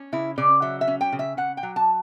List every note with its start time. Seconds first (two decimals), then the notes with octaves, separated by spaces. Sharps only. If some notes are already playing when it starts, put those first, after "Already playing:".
Already playing: C#4
0.12 C#3 E4
0.38 C#3 D5
0.62 F#3 E5
0.81 E5
0.88 C#4
1.01 G5
1.12 C#3
1.19 E5
1.37 C#3 F#5
1.57 G5
1.63 F#3
1.76 A5